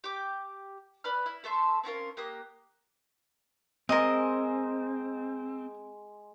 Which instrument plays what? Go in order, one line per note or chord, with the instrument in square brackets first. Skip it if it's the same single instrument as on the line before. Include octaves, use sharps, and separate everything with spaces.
[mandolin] G4 D6
B4 D5 B5 F6
E4
A3 A4 E5 C6
C4 C#4 F4 A#4
A#3 G4 D#6 F#6
[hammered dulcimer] G#3 G#5 C6 [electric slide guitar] C4 [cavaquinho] A#4 D#5